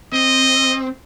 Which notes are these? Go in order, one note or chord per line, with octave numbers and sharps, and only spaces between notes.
C4 D#5